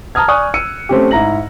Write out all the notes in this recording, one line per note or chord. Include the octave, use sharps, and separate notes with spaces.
A5 A#5 D#6 F6 G#6
D5 G#5 C#6 D#6 F#6
E6 C#7 D#7
A3 C4 C#4 G4
G#2 E4 A#5 A#6 F#7